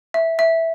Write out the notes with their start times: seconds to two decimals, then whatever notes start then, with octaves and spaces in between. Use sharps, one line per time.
0.14 E5
0.39 E5